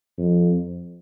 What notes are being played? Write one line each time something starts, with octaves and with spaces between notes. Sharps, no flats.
F2